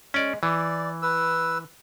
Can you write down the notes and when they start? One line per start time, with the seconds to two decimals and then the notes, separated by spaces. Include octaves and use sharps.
0.14 G#3 C#4 D5
0.43 E3 D5
1.02 B4 E6